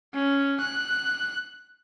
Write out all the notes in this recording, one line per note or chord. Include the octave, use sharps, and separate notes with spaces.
C#4
F#6